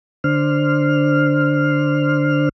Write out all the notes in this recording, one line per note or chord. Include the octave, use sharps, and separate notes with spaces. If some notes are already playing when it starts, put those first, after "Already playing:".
D3 D4 C5 F6